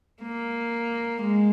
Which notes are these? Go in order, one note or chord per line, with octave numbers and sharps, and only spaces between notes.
A#3
G#3